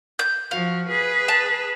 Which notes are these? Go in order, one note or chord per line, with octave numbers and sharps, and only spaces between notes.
G6
F3 F#4 F5
G#4 B4
A5